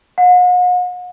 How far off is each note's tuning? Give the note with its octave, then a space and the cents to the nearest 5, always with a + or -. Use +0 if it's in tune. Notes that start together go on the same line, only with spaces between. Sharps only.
F#5 -45